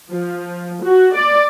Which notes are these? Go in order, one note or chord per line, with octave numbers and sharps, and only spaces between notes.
F3
F#4
D5